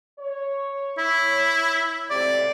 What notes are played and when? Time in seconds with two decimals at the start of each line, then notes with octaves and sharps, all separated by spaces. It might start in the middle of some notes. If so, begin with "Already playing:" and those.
0.19 C#5
0.98 E4
2.10 C#2 A2 C3 D5